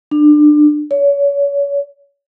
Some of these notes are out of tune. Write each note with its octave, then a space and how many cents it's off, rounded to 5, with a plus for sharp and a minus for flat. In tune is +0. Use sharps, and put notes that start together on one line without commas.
D4 +25
C#5 +30